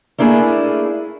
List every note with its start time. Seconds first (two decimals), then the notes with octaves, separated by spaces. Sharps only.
0.18 A3 A#3 D4 E4 G#4